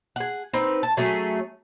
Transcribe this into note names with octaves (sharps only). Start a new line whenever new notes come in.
G#4 F#5
C4 D#4 B4
A5
F#3 A3 C#4 G#4